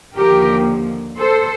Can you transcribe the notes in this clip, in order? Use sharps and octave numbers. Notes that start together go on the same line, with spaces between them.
D#2 D3 F3 A#3 G4 A#4
A4 C5